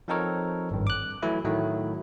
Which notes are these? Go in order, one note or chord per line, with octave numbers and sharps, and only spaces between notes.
F3 C4 D#4 A4 A#4 C#5
G#1 G2
D6 F#6
E3 F#3 A3 E4
A2 D#3 F#3 A3 E4